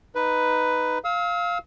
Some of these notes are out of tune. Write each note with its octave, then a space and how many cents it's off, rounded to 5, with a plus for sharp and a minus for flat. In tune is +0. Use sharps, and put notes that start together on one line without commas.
D#4 +0 B4 +5
F5 +0 E6 -40